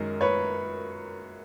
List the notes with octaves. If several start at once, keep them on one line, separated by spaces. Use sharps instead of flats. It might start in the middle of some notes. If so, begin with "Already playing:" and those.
Already playing: F#2 D#3 G#3 A#4
B4 C#5